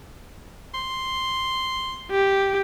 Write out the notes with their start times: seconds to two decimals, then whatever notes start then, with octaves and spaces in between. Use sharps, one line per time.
0.74 C6
2.11 G4